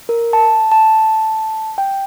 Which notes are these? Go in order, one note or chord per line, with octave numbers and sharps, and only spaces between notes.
A#4
A5
A5
G5